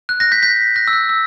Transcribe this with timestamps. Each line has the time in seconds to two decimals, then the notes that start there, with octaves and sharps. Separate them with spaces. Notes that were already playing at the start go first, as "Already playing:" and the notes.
0.09 F#6
0.20 F#6 A#6
0.32 G6 B6
0.42 G6 B6
0.76 F#6 A#6
0.88 E6
0.93 F#6
1.09 E6